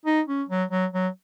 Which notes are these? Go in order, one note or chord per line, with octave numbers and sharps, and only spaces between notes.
D#4
C#4
F#3
F#3
F#3